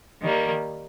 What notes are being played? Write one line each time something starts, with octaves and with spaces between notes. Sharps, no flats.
D#3 G3 A#3